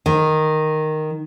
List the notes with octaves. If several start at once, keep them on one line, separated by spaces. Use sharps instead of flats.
D#3